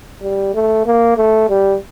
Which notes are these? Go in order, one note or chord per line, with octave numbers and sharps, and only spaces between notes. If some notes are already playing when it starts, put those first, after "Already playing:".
G3
A3
A#3
A3
G3